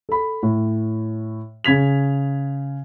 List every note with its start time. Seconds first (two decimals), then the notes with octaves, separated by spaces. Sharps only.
0.09 A4 B5
0.43 A2
1.64 C#3 G#6 B6 F7